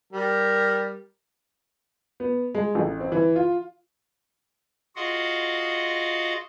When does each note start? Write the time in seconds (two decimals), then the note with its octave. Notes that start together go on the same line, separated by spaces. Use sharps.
0.13 G3 A#4
2.20 B3
2.55 G#3
2.75 A1
3.00 C4
3.12 E3
3.36 F4
4.96 F4 F#4 G#4 D#5 F5 F#5